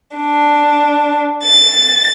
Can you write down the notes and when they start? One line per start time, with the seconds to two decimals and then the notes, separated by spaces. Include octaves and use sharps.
0.16 D4
1.42 A6